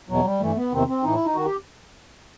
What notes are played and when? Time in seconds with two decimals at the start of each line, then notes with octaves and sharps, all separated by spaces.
0.09 E2 B2 F#3
0.25 G3
0.40 G2 E3 A3
0.56 B3
0.72 E2 C3 D#3 C4
0.88 C4
1.03 A2 E3 D#4
1.15 E4
1.25 D#4
1.35 D#3 F#4
1.46 G4